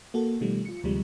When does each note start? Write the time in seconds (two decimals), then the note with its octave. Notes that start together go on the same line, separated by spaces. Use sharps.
0.14 A#3 F#4 A4
0.41 B2 D#3 F3 G3 A3
0.66 F4 C#7
0.84 D2 C3 F3 G3 G#3